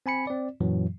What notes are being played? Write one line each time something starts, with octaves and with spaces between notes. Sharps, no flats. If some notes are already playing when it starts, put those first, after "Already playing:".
C4 G#5 B5 C#7
C4 D5
F#2 A#2 E3 F#3